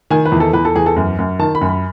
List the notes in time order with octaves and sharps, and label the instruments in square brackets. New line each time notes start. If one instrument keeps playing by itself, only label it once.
[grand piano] D#3 G#5
B4
E2
A4
E2 B4
A4
E2 G#4
A4
F#2
F#2
D#3 A5
B5
F#2
B5